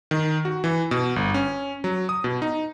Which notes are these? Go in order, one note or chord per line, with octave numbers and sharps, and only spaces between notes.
D#3
F#4
E3
B2
G1
C#4
F#3
D#6
B2
D#4